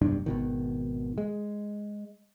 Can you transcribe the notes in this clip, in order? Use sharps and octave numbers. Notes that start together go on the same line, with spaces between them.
F1 B1 G2 D4
G#1 B2 D#3
G#3